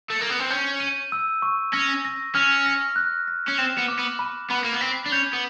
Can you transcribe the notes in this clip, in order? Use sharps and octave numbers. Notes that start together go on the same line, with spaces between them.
A3
A#3
B3
C4
C#4 G6
D#7
E6
C#6
C#4 A#6
A#6
C#4 F6
A#6
F#6
A#6
C#4
C4 E7
B3
D6
B3
B5
B3 B5
A#3
B3
C4 B6
D4
C#4 G6
B3